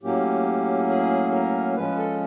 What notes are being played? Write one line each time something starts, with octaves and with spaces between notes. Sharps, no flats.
A2 F#3 A#3 C#4 G4
G#4
A#4
F3 G#3 C#4 B4
A4